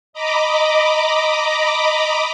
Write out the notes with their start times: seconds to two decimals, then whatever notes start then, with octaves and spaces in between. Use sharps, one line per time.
0.13 D#5 A#5 B5 D6